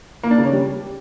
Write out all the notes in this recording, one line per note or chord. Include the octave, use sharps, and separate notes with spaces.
A#3
D4
C#3
C#4
G3